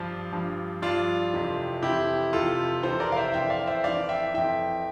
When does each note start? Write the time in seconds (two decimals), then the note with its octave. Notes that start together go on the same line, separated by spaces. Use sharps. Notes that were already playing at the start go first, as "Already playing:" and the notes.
Already playing: G2 F3 D4 F4
0.33 G2 F3
0.82 G2 F3 D4 F4
1.33 F2 C3 E3
1.82 F2 C3 E3 E4 G4
2.33 F2 C3 E3 F4 A4
2.83 F2 C3 E3 A4 C5
3.00 A#4 D5
3.12 F5
3.16 C5 E5
3.33 F2 E3 E5 G5
3.50 D5 F5
3.67 C5 E5
3.84 F2 E3 D5 F5
4.09 E5 G5
4.34 F2 E3 E5 G5